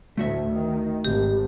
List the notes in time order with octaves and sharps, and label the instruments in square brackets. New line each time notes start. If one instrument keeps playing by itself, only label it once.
[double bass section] D2 A2 [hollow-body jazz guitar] A3 F#4 E5
[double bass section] D#3
[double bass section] G#1 [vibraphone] G4